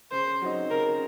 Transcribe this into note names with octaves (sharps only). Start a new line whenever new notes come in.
C#3 C5
F#3 C4 D#4
C#3 A#4